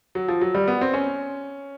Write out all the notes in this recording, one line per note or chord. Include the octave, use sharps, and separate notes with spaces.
F#3
F3
F#3
G3
B3
C4
C#4